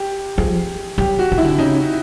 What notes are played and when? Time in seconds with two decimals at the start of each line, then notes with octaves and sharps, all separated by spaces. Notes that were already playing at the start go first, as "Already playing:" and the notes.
Already playing: G4
0.38 F3 G#4
0.98 F#3 G4
1.19 F#4
1.32 D#3
1.38 E4
1.44 D3
1.58 C#3 D#4